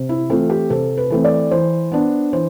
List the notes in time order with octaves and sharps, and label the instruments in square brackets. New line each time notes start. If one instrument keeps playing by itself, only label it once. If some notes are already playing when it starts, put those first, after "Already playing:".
Already playing: [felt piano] C3
E4
E3 A3 C4 F4
G4
C3 A4
B4
E3 A3 C4
D5
E3 C5
B3 D4
E3 C5